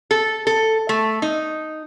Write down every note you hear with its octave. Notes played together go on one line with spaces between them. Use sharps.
A4
A4
A3
D#4